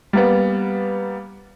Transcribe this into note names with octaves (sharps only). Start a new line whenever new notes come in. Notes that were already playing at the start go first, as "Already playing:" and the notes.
G3 A#3 B3